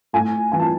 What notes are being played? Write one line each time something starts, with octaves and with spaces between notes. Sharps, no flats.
A2 G#5
E3 G#5
A5